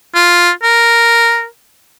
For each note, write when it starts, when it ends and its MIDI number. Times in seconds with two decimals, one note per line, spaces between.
0.15 0.50 65
0.63 1.45 70